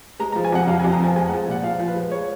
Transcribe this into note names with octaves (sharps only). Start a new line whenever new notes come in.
G#3 A#5
A#5
F3
G#5
F2 F#5
F2 F5
G#5
F2
A#5
F3 G#5
G#3 G#5
F#5
F3
A#2 F#5
F3 F5
F3
B4
G#3
C#5